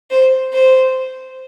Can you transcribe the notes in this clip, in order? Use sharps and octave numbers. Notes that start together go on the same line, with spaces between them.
C5
C5